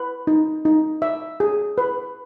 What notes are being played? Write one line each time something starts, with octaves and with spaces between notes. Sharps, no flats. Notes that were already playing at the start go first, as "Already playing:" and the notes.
Already playing: B4
D#4
D#4
E5
G#4
B4